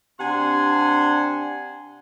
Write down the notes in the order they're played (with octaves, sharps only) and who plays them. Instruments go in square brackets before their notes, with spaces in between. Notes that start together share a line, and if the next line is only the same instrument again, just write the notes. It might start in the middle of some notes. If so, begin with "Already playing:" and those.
[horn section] C3 D4 F#5 G#5 C6